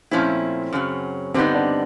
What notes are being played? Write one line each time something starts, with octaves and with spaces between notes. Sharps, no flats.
A#2 F3 A3 C4 C#4 E4
F#2 C#3 F#3
G2 D3 G3 B3 C4 D#4
D4